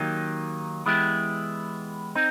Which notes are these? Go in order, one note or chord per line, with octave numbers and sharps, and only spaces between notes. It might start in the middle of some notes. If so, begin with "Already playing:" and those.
Already playing: D#3 F#3 A#3 D#4 G4
E3 G#3 B3 E4 G4
C4 D#4